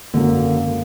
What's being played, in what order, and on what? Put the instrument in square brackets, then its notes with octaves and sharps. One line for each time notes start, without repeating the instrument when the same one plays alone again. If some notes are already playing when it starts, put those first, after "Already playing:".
[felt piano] G#1 F#2 [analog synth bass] D3 [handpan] A#3